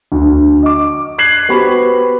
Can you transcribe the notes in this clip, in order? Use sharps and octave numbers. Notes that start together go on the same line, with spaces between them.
D2
D#5 D6
F#6 G#6 C7 F#7
B3 F#4 G4 C5 B5